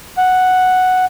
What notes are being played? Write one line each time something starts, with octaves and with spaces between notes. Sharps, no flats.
F#5